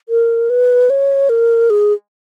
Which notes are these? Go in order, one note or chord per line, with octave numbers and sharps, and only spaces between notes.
A#4
B4
C#5
A#4
G#4